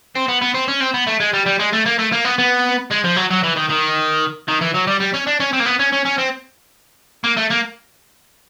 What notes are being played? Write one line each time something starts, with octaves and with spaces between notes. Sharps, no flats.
C4
B3
B3
C4
C#4
C4
B3
A3
G#3
G3
G3
G#3
A3
A#3
A3
A#3
B3
B3
G#3
F3
F#3
F#3
E3
D#3
D#3
D#3
E3
F#3
G3
G3
C#4
D4
C#4
C4
A#3
B3
C#4
C#4
C#4
C4
A#3
A3
A#3